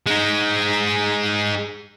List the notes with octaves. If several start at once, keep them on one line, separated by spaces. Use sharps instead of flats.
G#3 D#4